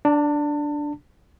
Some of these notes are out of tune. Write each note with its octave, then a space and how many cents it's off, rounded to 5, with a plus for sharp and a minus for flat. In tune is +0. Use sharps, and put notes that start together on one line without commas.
D4 -5 A5 +30